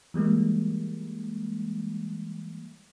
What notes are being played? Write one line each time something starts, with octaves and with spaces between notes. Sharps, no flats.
E3 G3 G#3 A#3